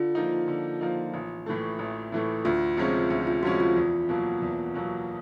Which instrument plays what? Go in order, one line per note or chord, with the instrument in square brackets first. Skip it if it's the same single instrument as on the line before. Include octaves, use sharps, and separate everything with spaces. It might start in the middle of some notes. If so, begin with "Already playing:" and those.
Already playing: [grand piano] D3 [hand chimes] F4
[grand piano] F3 A#3 D#4
D3
F3 A#3 D#4
A1
A2 E3 A3
A1
A2 E3 A3
[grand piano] D2 [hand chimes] F4
[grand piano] C3 F3 G#3 C#4
D2
[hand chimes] F4
[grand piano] C3 F3 G#3 C#4 [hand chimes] F#4
[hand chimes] F4
[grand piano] E2
B2 F#3 A#3
E2
B2 F#3 A#3